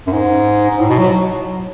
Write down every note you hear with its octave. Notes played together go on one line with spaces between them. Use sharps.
F#2
G#2
G#2
A2
B2
F#3